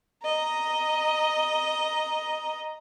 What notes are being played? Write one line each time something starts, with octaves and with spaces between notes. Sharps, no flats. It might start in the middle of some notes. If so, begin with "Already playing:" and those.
D#5 A#5